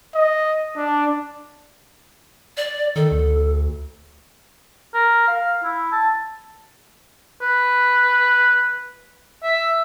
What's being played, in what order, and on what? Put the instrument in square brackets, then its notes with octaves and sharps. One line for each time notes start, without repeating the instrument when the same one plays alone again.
[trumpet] D#5
D4
[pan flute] D5
[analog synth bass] D#3 [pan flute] A4
[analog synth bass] D2
[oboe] A#4
F5
E4
A5
B4
E5